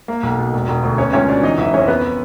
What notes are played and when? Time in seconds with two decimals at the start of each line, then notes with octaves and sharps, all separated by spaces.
0.08 A#3
0.23 B1
0.38 B2
0.53 E1
0.68 E1
0.83 D2
0.98 B3 C#4 C#5
1.13 C#2 C#4 C#5
1.28 B2 D4 D5
1.43 E3 D#4 D#5
1.58 F#1 E4 E5
1.73 F2 C#4 C#5
1.88 B3 B4